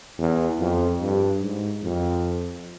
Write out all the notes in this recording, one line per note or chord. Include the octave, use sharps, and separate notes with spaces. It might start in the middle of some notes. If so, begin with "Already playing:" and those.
E2
F2
G2
G#2
F2